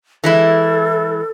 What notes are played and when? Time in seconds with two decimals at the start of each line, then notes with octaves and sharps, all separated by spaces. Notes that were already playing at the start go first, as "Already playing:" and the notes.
0.24 E3 G#3 E4 A4